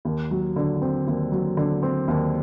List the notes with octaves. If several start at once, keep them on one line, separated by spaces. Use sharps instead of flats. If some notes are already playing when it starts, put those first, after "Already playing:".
D#2
F#3
D3
C4
D#2
F#3
D3
C4
D#2